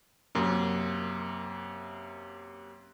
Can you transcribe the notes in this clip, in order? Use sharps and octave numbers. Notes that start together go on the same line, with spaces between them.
F#2 C3 A#3